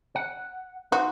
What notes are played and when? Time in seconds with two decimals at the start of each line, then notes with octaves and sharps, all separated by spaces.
0.16 F#5
0.92 D#4 F#4 C5